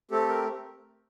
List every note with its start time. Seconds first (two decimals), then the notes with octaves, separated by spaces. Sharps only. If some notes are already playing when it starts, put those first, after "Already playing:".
0.11 A3 C4 G4 A4
0.29 A#4